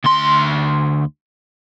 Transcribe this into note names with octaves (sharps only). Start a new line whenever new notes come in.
D2 C6